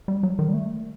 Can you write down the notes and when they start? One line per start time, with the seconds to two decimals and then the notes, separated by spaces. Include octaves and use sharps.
0.08 G3
0.23 F#3
0.39 D#3
0.48 G3
0.54 A3